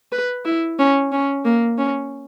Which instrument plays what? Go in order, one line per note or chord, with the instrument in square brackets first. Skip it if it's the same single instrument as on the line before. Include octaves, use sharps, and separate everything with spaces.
[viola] B4
E4
C#4
C#4
A#3
C#4